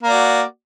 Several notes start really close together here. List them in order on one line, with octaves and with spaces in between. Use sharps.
A#3 D5 F#4